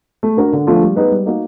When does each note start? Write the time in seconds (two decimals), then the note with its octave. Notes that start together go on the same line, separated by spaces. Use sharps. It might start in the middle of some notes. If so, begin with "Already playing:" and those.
0.23 A3
0.37 D4 F#4 A#4
0.53 D3
0.67 F3 A3 D4 F4
0.82 G3
0.96 B3 D#4 G#4 B4
1.11 G3
1.26 A#3 D#4 F#4